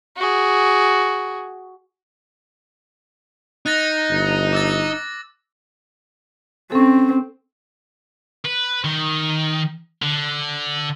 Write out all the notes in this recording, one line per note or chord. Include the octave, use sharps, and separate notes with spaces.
F#4 G#4
D#4 F#6 A6 A#6
G1
D6 E6 A6
C4 C#4 A4
B4
D#3
D3